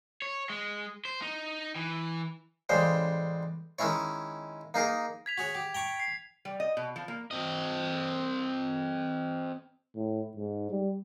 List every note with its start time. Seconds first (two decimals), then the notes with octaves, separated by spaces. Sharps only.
0.22 C#5
0.50 G#3
1.05 C5
1.22 D#4
1.76 E3
2.69 A1 C#3 G3 G#3 C5
3.79 D#3 G#3 C#4 E4 C#5
4.74 A#3 D#4 G#4 A#4
5.26 G#6 B6 F7
5.38 F#4 G#4 C#5
5.55 G4
5.75 G5 A#5 C#6
6.00 C7
6.45 G3
6.60 D#5
6.77 B2
6.96 F3
7.08 A#3
7.31 C4 D#5
9.95 A2
10.37 G#2
10.70 G3